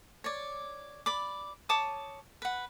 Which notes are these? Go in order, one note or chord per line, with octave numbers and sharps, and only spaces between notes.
C#5 D5
D5 B5 D6
C#5 A5 D6 D#6
B4 F#5